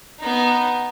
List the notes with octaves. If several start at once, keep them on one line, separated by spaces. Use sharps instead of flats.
B3 D#4